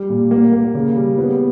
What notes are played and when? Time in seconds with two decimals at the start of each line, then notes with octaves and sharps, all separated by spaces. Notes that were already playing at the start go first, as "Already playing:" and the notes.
Already playing: G3
0.09 A#2
0.31 A#3
0.53 A#3
0.74 C#3
0.96 G3
1.18 B3